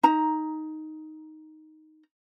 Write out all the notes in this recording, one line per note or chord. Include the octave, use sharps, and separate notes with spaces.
D#4 A#5